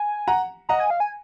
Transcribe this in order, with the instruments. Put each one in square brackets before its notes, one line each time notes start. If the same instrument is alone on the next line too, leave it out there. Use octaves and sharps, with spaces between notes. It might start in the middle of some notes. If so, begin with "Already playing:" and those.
Already playing: [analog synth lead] G#5
[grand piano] F#5 A#5
[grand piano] D#5 F#5 [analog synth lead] A#5
[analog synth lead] G#5
F5
G#5